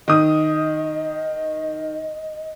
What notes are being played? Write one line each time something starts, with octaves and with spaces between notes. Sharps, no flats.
D#3 D#5 D#6